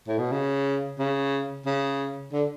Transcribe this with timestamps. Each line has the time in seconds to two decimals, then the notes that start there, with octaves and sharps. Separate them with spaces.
0.08 A2
0.19 B2
0.32 C#3
0.99 C#3
1.66 C#3
2.33 D3